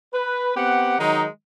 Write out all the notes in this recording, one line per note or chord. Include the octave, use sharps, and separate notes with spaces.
B4
B3 C4 G4 F#5
D#3 F#3 G#3 D#4